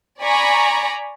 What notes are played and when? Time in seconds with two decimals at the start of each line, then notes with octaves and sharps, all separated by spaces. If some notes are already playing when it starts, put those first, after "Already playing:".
0.21 D5 G#5 A#5 B5 C#6